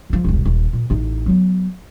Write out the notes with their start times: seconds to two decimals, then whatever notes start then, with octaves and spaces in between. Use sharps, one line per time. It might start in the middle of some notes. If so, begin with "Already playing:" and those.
0.10 C#3 F3
0.24 E1 C2
0.45 D#1
0.73 A#2
0.90 A1 D#4
1.26 F#3 B3